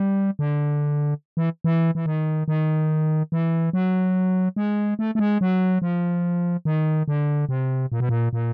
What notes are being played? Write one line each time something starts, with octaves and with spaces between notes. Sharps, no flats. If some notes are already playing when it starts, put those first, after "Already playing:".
Already playing: G3
D3
E3
E3
E3
D#3
D#3
E3
F#3
G#3
A3
A3
G#3
F#3
F3
D#3
D3
C3
A#2
B2
A#2
A#2